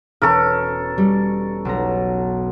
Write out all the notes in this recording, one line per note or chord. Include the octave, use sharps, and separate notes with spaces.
E1 C#4 A4 A#4
G3
B1 A#5